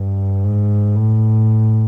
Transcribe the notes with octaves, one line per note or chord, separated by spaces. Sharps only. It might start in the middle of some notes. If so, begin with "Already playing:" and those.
Already playing: G2
G#2
A2